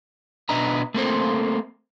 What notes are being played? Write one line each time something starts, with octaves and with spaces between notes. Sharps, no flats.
B2 D4 B4 D#5 E5 A#5
A3 A#3 C4 A4 C5